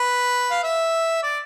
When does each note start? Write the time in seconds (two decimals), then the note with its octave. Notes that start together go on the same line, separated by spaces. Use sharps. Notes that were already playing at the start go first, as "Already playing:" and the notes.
Already playing: B4
0.51 F5
0.64 E5
1.23 D5